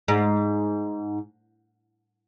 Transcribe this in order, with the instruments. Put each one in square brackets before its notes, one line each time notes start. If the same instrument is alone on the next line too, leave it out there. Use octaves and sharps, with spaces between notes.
[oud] G#2